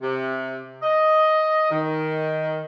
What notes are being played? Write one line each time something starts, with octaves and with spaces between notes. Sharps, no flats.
C3
D#5
D#3